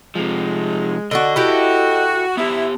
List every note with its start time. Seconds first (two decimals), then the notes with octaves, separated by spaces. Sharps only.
0.15 C3 F3 G#3
1.11 D3 D4 F#4 D#5
1.36 E4 F#4 G4 A4
2.37 B3 E4 G4